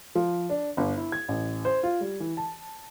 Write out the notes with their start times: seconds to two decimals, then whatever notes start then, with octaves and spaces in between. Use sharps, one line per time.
0.15 F3
0.50 D4
0.77 G1
0.97 E4
1.12 G#6
1.28 A1
1.65 C5
1.83 F4
2.00 G3
2.20 E3
2.37 A5